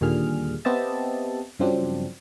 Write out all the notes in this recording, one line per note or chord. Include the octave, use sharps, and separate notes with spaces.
D#2 A#2 D3 G3 G#4 F6
B3 C4 G4 D#5 E5 A5
G2 C#3 F3 F#3 C4 D4